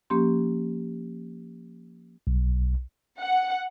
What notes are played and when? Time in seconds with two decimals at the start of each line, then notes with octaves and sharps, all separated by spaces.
0.10 F3 A#3 C#4 G4 C6
2.27 B1
3.19 F#5